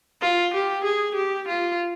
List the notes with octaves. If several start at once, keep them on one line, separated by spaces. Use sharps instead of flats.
F4
G4
G#4
G4
F4